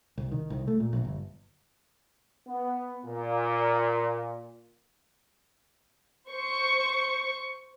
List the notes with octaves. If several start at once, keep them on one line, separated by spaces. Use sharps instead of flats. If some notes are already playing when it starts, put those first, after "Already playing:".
C2
D#3
C2
A3
A#2
A#1
G1
B3
A#2
C5 C#6